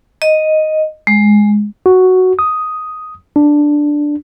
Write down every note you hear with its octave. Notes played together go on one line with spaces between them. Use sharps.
D#5
G#3
F#4
D#6
D4